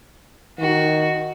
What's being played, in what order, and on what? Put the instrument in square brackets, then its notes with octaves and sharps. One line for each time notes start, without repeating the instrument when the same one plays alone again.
[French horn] D#3 [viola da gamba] F#4